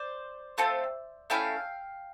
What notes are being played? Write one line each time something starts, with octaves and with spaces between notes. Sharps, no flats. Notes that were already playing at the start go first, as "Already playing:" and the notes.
Already playing: C5 D5
A3 C4 F4 A4
A3 C#4 E4 F5 G5